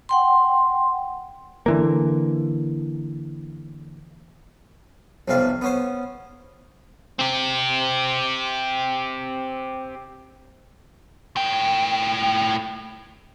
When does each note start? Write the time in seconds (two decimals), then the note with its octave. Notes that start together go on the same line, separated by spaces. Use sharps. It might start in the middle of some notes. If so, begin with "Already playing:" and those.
0.09 F#5 G5 C6
1.66 D3 E3 A#3
5.28 B1 F2 C3 G3 F5
5.62 B3 C#4 C5
7.19 C4 G4
11.36 A2 G5